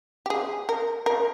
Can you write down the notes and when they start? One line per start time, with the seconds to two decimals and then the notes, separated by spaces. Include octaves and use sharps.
0.26 G4
0.30 G#4
0.69 A#4
1.06 A#4